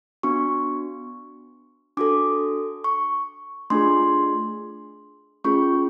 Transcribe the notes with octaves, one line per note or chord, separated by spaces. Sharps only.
B3 D4 F#4 C#6
D4 F#4 A4 D6
C#6
A3 D4 F4 G#4 C6
A3 C#4 F4 G#4 C#6